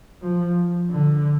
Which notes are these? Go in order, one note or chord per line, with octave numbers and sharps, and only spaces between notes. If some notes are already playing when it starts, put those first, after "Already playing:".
F3
D3